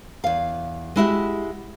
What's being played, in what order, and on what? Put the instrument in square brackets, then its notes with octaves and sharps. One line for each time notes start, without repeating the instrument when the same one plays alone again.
[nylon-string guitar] E2 F5
G#3 E4 F#4 G4